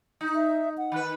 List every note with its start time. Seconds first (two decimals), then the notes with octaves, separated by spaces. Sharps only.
0.21 D#4
0.35 E5
0.78 F#5
0.92 D#3 B4